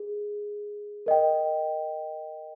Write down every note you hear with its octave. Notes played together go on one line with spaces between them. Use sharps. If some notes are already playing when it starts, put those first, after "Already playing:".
Already playing: G#4
A#4 D#5 G5